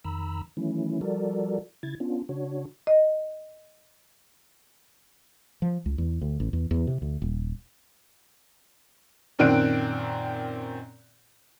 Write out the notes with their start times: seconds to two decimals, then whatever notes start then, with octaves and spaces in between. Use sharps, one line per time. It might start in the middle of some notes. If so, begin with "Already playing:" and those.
0.04 F2 D#3 A#5 B5 E6
0.57 D#3 E3 F#3 A3 C#4 E4
1.01 F3 G3 F#4 A4 A#4 D5
1.83 C#3 E4 G#6 A6
2.00 B3 C#4 D4 F4
2.29 C#3 D4 F#4 C#5
2.87 D#5
5.62 F3
5.86 C#2
5.98 E2
6.21 D2
6.40 A1
6.53 E2
6.71 E2
6.87 C3
7.02 D2
7.22 D#1
9.39 F#2 A#2 D#3 C4 F#6 D7